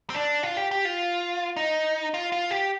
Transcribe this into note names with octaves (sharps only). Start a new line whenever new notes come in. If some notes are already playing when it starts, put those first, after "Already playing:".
C4
D4
F4
G4
G4
F4
D#4
F4
F4
G4